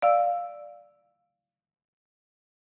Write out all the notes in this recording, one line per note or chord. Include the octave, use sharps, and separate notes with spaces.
D5 F5 E6